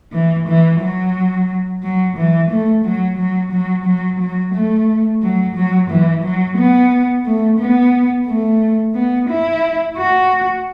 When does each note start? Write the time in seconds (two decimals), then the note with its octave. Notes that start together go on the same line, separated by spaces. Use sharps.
0.13 E3
0.48 E3
0.81 F#3
1.83 F#3
2.17 E3
2.50 A3
2.85 F#3
3.18 F#3
3.52 F#3
3.86 F#3
4.20 F#3
4.54 A3
5.22 F#3
5.56 F#3
5.90 E3
6.24 F#3
6.58 B3
7.25 A3
7.59 B3
8.27 A3
8.95 B3
9.29 E4
9.97 F#4